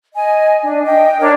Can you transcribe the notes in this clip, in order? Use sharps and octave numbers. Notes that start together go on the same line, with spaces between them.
D#5 G#5
D4
D#5 G5
D4 A#4 C#5